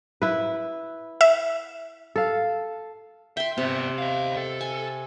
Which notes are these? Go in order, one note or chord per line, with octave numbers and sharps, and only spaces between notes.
E4 B4
E5
A4 F5
E5 G5 C6
C3 B3 G4
D#5 F5
A4
G#5